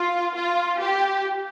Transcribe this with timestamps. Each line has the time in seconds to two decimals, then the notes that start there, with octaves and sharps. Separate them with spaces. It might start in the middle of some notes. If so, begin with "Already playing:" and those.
Already playing: F4
0.36 F4
0.81 G4